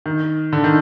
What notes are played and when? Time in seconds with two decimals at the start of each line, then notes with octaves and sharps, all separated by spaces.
0.06 D#3
0.53 D3
0.64 D#3